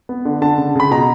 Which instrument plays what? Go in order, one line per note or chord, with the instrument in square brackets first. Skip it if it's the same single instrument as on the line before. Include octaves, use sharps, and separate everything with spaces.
[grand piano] B3
D3
D3 A5
C#3
C#3 B5
B2 A#5